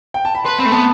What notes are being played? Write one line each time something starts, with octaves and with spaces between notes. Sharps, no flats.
G5
A5
B5
B4 C6
C4 B5
A3
B3 A5